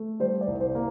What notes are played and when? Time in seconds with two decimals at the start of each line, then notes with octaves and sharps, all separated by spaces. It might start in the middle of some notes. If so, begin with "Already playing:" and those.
Already playing: A3
0.20 G3 C5
0.41 D5
0.47 C2
0.60 C5
0.75 A#3